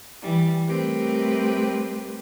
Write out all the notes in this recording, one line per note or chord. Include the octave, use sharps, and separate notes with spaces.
E3 G3
G3 A3 C4 G4 A#4 B4